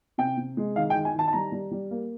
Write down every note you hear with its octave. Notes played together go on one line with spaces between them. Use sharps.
C3 G5
C3
G#3
D#3 F5
G5
D#3
G#5
D#3 A5
A5
G3 A#5
G3
G3
A#3